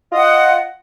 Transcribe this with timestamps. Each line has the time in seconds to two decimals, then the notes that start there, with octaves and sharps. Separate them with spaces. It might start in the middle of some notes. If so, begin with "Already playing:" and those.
0.11 F4
0.13 D#5
0.16 F#5